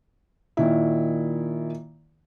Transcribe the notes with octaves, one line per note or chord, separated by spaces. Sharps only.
A#2 D#3 E4